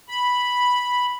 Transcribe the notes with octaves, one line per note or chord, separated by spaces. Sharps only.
B5